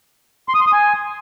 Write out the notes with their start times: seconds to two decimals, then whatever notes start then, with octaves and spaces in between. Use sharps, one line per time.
0.49 C6
0.55 D#6
0.61 C6
0.67 D#6
0.73 G#5